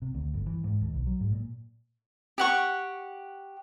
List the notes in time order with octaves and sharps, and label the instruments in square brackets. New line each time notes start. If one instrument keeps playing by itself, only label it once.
[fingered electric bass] C3
D2
G1
E3
G#2
D#2
B1
F#3
G#2
A#2
[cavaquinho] G4 F#5 C#6